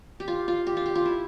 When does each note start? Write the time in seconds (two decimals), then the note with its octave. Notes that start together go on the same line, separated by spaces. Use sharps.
0.20 G4
0.28 F4
0.48 F4
0.67 G4
0.77 F4
0.86 G4
0.95 F4
1.05 E4